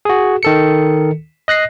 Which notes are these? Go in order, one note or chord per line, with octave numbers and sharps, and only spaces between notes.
F#4 G#4
D#3 A4 C#7
D#5 F#6 A#6 C7